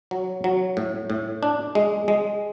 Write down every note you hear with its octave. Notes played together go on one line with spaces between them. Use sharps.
F#3
F#3
A2
A2
D4
G#3
G#3